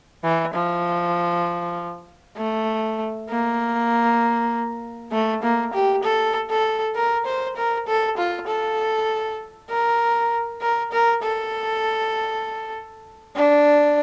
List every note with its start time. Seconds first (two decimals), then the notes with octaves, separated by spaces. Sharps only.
0.24 E3
0.54 F3
2.37 A3
3.29 A#3
5.12 A3
5.43 A#3
5.74 G4
6.04 A4
6.50 A4
6.95 A#4
7.26 C5
7.56 A#4
7.87 A4
8.17 F4
8.47 A4
9.70 A#4
10.61 A#4
10.92 A#4
11.23 A4
13.36 D4